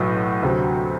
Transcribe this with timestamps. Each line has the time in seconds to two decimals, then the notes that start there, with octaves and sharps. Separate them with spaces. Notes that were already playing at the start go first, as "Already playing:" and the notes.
Already playing: B1 A2 F#3 B3
0.42 D2 C3 F#3 C4